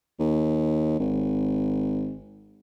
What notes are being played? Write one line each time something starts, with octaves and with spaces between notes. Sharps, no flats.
D#2
G#1